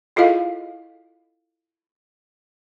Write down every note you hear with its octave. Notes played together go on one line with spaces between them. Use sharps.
E4 F4 G#4 A4 D#5 F5